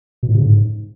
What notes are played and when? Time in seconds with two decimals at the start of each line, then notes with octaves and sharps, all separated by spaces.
0.23 B2
0.29 A2
0.34 C3
0.40 C#3
0.46 G#2